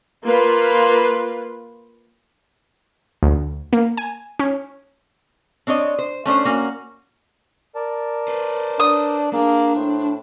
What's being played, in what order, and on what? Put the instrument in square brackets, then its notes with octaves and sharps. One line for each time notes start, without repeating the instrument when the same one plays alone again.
[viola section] A#3 F4 B4
[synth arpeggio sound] D2
A#3
G#5
C#4
[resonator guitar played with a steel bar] C4 D4 C#5 D#5
C5
A3 C#4 D4 C5
A#3 C#4 F#4
[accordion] A#4 D5 A5
[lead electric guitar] B4 C5
[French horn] D4 [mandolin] D#6
[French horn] A#3 [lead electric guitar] D4 [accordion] G#4
[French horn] A2 [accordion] C5